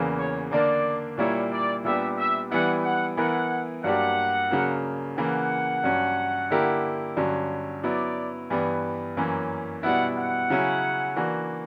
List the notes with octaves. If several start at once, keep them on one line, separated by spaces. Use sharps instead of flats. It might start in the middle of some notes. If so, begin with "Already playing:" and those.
Already playing: E2 C#3 E3 A#3
C#5
D3 A#3 D4 A#4 D5
A#2 G3 A#3 E4 C#5
D5
A#2 G3 B3 D4 G4 E5
E5
E3 G3 B3 E4 F#5
F#5
E3 B3 E4 A#4 F#5
G2 F#3 A#3 D4 G4 F#5
C#3 F#3 A#3
C#3 E3 A#3 F#5
G2 F#3 C#4
D3 A#3 E4 G4 A#4
G2 D3 F#3 C#4
F#3 B3 E4 D5
G2 E3 G3 B3
F#2 E3 A#3 C#4
B2 G3 B3 E4 F#5
F#5
C#3 F#3 C#4 E4
E3 A#3 D4 F#4